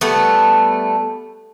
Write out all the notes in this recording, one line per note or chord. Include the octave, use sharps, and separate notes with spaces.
G3 A3 B3